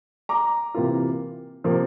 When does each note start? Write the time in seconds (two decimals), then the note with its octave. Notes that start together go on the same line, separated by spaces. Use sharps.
0.29 A#5 D6
0.74 C3 E3 A#3 F4
1.64 C3 F3 A#3